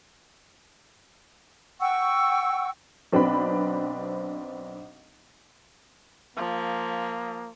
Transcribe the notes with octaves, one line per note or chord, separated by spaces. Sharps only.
F#5 G5 C#6 E6
B1 C4 D4 B4 B5
F3 A#3